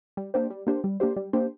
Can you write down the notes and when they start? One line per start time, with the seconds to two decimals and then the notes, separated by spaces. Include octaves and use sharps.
0.17 G3
0.34 A#3 D4 G4 C5
0.50 G3
0.67 A#3 D4 G4 C5
0.84 G3
1.00 A#3 D4 G4 C5
1.16 G3
1.33 A#3 D4 G4 C5